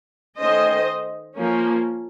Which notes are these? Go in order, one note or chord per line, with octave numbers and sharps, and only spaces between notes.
D#3 A3 C#4 C5 D#5
F3 A#3 C#4